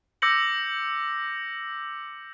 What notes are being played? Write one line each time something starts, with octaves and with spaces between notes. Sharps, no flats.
D6 E6 G6 A#6 C#7 F#7